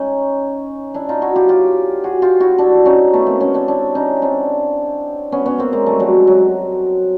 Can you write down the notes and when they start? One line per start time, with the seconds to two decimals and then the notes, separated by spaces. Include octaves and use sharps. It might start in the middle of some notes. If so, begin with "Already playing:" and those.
Already playing: C#4 D#4
0.94 D4 E4
1.09 D#4 F4
1.22 E4 F#4
1.36 F4 G4
1.49 F4 G4
2.04 F#4 G#4
2.22 F4 G4
2.40 E4 F#4
2.58 D4 E4
2.86 C#4 D#4
3.13 A3 B3
3.26 A#3 C4
3.41 B3 C#4
3.54 C4 D4
3.68 D4 E4
3.95 C#4 D#4
4.22 C4 D4
5.32 B3 C#4
5.46 B3 C#4
5.58 A#3 C4
5.72 G#3 A#3
5.86 G3 A3
6.00 F#3 G#3
6.27 F#3